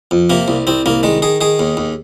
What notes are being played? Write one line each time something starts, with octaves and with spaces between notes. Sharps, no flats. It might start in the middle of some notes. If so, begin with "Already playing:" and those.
F2
C3 A#3
C2
C2 C4
C2 A#3
D#3 G#3
D#3 G#4
D#3 G#4
D#2
D#2